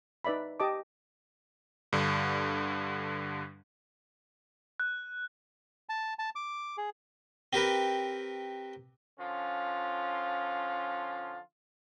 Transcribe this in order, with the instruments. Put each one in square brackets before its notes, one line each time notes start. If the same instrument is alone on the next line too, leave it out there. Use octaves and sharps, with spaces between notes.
[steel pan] D#4 B4 D5 E5 B5
G4 D#5 A5 D6
[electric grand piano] G2 D3
[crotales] F#6
[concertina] A5
A5
D6
G#4
[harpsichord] C4 G4 A#4 B4
[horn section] D3 F3 C#4 F4